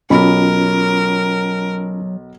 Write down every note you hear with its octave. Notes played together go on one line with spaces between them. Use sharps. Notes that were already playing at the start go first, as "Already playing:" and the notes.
B1 F#3 C#4 F4 A#4 B5